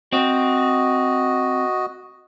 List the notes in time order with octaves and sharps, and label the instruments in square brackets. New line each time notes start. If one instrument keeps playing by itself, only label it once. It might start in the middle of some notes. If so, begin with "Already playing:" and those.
[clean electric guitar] C4 [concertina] F#4 D#5